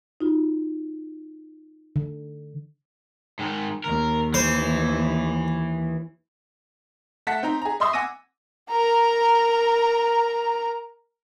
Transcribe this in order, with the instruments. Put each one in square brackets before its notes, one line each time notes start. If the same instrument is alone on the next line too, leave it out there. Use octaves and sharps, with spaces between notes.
[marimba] D#4 F4 F#4
[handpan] D3
[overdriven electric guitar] G#2 D#3
[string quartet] D#2 [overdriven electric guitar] A#4
[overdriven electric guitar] E3 [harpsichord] C5
[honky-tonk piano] A3 F#5 A5 B6
C4 D#4 A#5
G#4 A#5
D#5 E5 C6 C#6 D#6 E6
F#5 G#5 D6 E6 A#6 D#7
[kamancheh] A#4 A#5